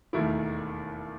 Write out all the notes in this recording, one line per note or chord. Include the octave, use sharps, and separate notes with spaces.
E1 D#2 D#3 A3 E4